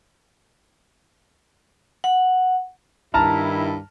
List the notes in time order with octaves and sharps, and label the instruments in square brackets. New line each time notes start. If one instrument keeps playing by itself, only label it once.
[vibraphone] F#5
[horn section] G2 D#3 E4 [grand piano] A5 A#5 F6